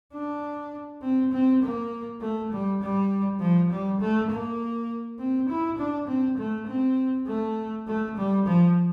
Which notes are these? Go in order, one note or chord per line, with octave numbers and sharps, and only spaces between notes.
D4
C4
C4
A#3
A3
G3
G3
F3
G3
A3
A#3
C4
E4
D4
C4
A3
C4
A3
A3
G3
F3